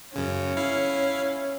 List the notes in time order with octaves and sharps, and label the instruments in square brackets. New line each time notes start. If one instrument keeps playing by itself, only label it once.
[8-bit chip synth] F#2 C#3 [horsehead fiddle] C#4
[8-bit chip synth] E4 F5